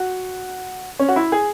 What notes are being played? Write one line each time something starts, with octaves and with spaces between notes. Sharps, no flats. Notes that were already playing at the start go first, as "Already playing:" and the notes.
Already playing: F#4
C#4
F#4
E4
G#4